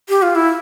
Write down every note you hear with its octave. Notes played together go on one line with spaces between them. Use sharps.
G4
F4
E4